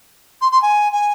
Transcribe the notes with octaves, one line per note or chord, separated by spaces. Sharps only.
C6
C6
G#5
G#5